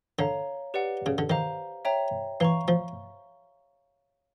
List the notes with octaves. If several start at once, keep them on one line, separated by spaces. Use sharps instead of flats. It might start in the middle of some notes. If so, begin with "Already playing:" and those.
D3 C#5 F5 A#5
G4 B4 D5 F#5
C#3
D3
D#3 C5 F5 A#5
C#5 E5 G5 A#5
E3 F5 A#5 C#6
F3